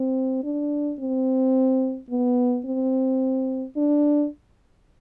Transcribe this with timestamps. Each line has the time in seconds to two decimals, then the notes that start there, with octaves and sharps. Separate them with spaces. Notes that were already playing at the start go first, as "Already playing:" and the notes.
Already playing: C4
0.44 D4
0.99 C4
2.10 B3
2.66 C4
3.77 D4